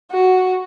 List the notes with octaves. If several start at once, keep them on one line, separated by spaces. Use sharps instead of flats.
F#4